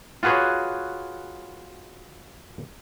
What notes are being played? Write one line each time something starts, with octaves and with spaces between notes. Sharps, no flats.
F4 F#4 G#4 B4 C#5